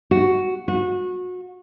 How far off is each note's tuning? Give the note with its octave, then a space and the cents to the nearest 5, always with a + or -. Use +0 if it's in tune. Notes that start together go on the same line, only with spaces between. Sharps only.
F#4 +5
F#4 -30